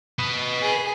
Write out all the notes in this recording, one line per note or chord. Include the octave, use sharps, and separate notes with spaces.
B4 D#5
G#4